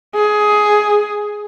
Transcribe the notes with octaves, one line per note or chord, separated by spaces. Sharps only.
G#4